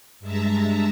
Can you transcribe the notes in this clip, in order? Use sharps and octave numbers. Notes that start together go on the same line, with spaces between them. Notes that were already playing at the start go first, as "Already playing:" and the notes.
G2 G#3 E5 A5 A#5